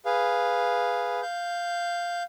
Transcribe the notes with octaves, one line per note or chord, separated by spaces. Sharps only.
G#4 B4 F5
F5 G6